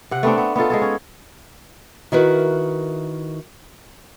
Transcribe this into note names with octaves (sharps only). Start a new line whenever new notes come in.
C3 F#5
A3 B3 C4 D4
B3
B3 D#4 F4 A4
G#3 G#4 A4
C#4
D#3 E4 F#4 A#4 B4